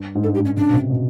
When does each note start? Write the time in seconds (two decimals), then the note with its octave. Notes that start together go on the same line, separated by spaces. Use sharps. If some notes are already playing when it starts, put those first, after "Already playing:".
Already playing: G2
0.15 G#2
0.23 G2 A4
0.34 G4
0.40 G#2
0.45 C#4
0.57 C#3 D4
0.69 B2
0.73 C3
0.90 B2